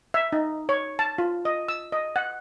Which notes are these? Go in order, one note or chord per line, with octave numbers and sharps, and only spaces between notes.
E5
D#4
C#5
A5
F4
D#5
E6
D#5
F#5